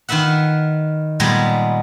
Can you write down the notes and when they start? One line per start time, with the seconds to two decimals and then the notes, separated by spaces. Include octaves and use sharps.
0.09 D#3 F4 B4 E5 F#5
1.20 A#2 G3 G#3 B3